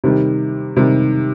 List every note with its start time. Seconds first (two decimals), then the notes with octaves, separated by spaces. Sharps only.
0.04 C3 D#3 G3
0.76 C3 D#3 G3